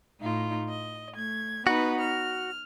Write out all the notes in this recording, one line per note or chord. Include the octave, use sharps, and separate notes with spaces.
A2 D#4 F4
D#5
A3 G#6
B3 D#4 F#4 B4
F6